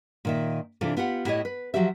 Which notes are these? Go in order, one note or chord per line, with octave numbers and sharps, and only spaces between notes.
A#2 D#3 E5
C3 E3 D4 F4 A4
B3 F4 G4 F#5
A2 E4 G4 A#4 C#5 D#5
B4
F3 F#3 F#4 G4 E5